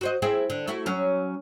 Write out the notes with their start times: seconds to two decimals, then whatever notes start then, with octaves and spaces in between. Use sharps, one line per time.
0.01 F#4 C5 D#5
0.22 C4 E4 G#4
0.50 D3
0.68 A3 E4 F#4
0.86 F#3 C#4